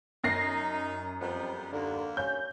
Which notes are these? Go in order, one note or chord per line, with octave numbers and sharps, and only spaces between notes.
F#2 D#4 A#6 C7
F2 G3 B3
D#2 D3 A#3
C#4 G6